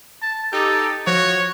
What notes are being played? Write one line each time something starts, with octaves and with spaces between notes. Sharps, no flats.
A5
D#4 G4 A4
F3 F#4 C#5